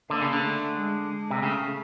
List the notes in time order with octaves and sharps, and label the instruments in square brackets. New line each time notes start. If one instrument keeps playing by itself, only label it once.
[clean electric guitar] D3 [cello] A#3
[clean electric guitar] C#3
D3
[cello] A3
G#3
[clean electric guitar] C3
[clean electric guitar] C#3 [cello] A3